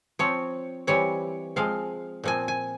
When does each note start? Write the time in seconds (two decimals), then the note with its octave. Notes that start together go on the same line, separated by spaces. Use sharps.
0.19 F3 C4 C#5
0.87 E3 G3 C4 C#5
1.56 F3 G#3 C4 F5
2.24 A#2 F3 C4 G#5
2.48 G#5